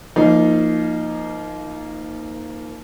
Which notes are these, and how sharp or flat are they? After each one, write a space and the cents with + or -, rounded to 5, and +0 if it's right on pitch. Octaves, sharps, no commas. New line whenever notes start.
F3 -25 A#3 +0 D#4 +0